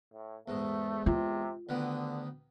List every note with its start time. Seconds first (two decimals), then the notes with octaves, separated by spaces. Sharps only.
0.14 A2
0.48 E2 G#2 A3
1.06 C3 F4
1.69 D2 D3 D#3 B3